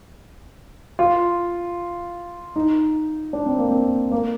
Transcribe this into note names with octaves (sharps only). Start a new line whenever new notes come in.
F4
D#4
D4
C4
A#3
C4
A#3